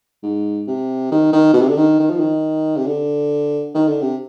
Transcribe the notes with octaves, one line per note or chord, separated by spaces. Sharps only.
G#2
C3
D#3
D#3
B2
C3
D3
D#3
D#3
F3
D#3
C3
D3
D#3
D3
C3